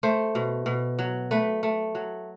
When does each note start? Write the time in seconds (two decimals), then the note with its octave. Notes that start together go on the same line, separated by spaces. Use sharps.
0.03 A3 C5
0.35 B2
0.66 B2
0.99 F#3
1.31 A3 B4
1.63 A3
1.95 F#3